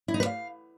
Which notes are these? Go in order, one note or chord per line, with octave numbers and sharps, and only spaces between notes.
E4
D#4
B4
F5